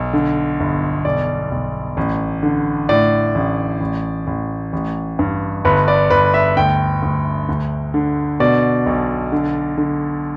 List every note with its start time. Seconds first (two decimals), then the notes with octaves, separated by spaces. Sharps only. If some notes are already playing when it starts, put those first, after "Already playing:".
Already playing: B1
0.13 D3
0.60 G1
1.05 B1 D5
1.51 B1
1.97 A1
2.43 D3
2.89 A2 D5
3.35 A1
3.81 A1
4.27 A1
4.73 A1
5.19 G2
5.65 G1 B4
5.88 D5
6.10 G1 B4
6.34 E5
6.57 D2 G5
7.02 D2
7.49 D2
7.94 D3
8.40 B2 D5
8.86 B1
9.32 D3
9.78 D3